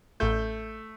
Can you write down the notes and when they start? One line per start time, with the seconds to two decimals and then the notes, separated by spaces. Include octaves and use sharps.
0.20 A1 A3 G6